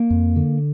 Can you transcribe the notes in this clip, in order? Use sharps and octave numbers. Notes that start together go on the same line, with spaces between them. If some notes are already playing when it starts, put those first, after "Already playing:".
Already playing: A#3
F2
D3